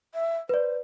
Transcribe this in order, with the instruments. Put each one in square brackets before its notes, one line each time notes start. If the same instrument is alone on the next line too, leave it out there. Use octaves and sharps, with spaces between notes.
[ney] E5
[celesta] B4 D5 [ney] C5